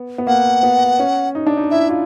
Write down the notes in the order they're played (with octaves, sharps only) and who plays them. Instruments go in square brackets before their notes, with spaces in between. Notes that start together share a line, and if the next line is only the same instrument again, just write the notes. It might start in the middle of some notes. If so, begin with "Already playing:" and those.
Already playing: [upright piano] B3
B3
[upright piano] A#3 [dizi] F#5
[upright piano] B3
C#4
D#4
D4
D#4
[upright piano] E4 [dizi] E5
[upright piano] F4